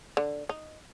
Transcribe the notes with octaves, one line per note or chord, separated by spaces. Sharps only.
D3
D#4